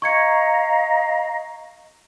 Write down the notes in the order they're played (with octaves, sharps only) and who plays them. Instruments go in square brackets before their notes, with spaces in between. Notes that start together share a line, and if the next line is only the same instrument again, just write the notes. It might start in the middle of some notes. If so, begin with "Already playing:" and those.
[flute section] D#5 F5 A#5 [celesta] C#6 G#6 C#7